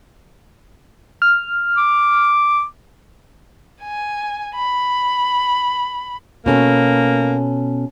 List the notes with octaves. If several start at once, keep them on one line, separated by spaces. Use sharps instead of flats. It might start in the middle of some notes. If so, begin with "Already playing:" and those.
F6
D6
G#5
B5
B2 A#3 C#4 A4